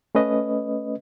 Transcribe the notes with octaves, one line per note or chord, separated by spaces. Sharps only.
A3 C#4 B4 D#5